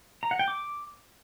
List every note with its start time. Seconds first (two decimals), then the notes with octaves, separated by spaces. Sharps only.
0.23 A#5
0.31 F#5
0.39 G5
0.48 D6